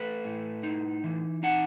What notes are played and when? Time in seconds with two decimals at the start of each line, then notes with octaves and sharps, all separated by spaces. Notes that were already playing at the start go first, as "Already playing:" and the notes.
Already playing: A3 B4
0.24 A2
0.63 D#4
1.04 E3
1.43 D#4 F#5